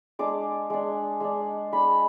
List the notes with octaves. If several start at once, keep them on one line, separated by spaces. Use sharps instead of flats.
G#3 D4 D6
G#3 D4
G#3 D4
G#3 D4 B5